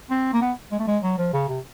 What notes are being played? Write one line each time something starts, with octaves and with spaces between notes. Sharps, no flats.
C4
A#3
B3
G#3
A3
G#3
F#3
F3
C#3
C3